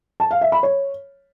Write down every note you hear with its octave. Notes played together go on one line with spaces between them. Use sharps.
A5
F5
E5
B5
C#5